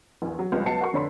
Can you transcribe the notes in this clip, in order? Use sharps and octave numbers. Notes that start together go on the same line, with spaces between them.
A#1 E2
F#3
C#2 F3 G3
C#2 F#3 B3 A5 C7 C#7
F#4 A#4 C#6
F1 D3 C#5 D5 B5 C6